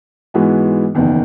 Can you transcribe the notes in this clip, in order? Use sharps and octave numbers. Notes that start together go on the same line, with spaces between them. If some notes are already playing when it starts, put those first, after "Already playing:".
G#2 E3 G#3 B3 F#4
F#1 E2 D#3